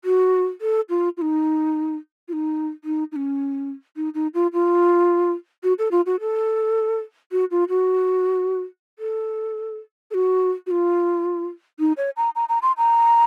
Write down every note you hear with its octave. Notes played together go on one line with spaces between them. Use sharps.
F#4
A4
F4
F4
D#4
F4
D#4
D#4
D#4
C#4
D#4
D#4
F4
F4
F#4
A4
F4
F#4
A4
F#4
F4
F#4
A4
A4
F#4
F#4
F4
D#4
C#5
A#5
A#5
A#5
C6
A#5